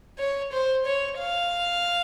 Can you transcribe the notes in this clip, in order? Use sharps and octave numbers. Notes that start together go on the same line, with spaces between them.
C#5
C5
C#5
F5